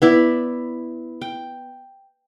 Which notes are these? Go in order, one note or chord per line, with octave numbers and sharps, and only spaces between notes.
B3 E4 D5
G5